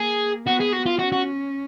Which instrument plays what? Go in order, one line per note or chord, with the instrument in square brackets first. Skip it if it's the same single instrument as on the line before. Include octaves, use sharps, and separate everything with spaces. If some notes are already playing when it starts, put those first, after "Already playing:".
Already playing: [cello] A#3 [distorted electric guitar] G#4
[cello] B3 [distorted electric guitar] F#4
[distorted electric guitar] G#4
F#4
F4
[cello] C#4 [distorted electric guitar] F#4
[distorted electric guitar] F#4